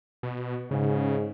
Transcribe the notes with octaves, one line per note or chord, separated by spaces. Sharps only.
B2
G#2 C#3